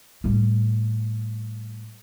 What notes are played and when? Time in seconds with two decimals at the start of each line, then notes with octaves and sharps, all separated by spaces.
0.24 A2 G3